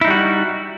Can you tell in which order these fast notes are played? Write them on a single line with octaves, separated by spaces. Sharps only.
E4 D#4 G3 F#4